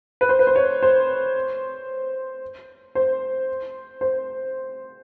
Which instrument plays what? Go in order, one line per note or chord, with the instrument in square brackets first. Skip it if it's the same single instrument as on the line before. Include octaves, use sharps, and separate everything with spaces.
[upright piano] B4
C5
B4
C5
C#5
C5
C5
C5